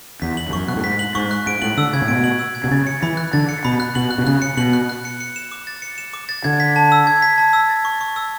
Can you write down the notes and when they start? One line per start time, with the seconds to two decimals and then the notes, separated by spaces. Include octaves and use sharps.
0.22 E2 B6
0.37 F#7
0.49 E2
0.53 F#2 C#6
0.68 B2 F#6
0.76 A2
0.84 G#2 B6
0.99 F#7
1.15 G#2 C#6
1.31 F#6
1.47 G#2 D7
1.62 A2 F#7
1.77 D3 E6
1.93 C#3 G#6
2.02 A2
2.08 B2 D7
2.24 F#7
2.39 E6
2.55 G#6
2.64 B2
2.71 C#3 A6
2.87 C#7
3.02 E3 B5
3.17 F#6
3.33 D3 A6
3.49 C#7
3.65 B2 B5
3.80 F#6
3.95 B2 F#7
4.11 F#6
4.18 B2
4.27 C#3 F#6
4.42 C#7
4.57 B2 F#7
4.73 F#6
4.89 F#6
5.05 C#7
5.20 C#7
5.36 E7
5.52 D6
5.67 A6
5.82 C#7
5.98 E7
6.13 D6
6.29 A6
6.44 D3 G#6
6.60 B6
6.76 A5
6.92 E6
7.07 G#6
7.22 B6
7.38 A5
7.53 E6
7.69 A6
7.85 C#6
8.01 C#6
8.16 E6